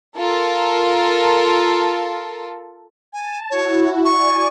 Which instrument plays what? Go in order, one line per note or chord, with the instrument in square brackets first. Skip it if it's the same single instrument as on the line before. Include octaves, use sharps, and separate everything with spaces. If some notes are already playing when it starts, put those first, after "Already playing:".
[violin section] F4 A4 A#4
[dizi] G#5 [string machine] A5
[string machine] E4 F#4 [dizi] C#5
[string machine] D5 G#5 [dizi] C#6